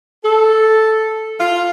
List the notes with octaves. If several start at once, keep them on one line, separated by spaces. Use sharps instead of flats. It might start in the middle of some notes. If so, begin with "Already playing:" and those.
A4
F4